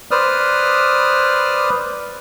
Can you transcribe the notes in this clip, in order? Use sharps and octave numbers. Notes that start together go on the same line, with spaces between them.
B4 C5 D5 D#6 F6